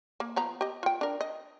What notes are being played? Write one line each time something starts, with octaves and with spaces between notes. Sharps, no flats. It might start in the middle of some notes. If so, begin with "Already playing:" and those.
A#3
F3 B3 A#5
G4 D#5
F4 G5
D4 A#4
D#5